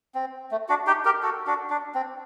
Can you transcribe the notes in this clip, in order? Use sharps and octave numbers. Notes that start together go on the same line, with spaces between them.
C4
A3
D4 F#4
D#4 G4
G4 A#4
F#4 A4
D4 F#4
D4
C4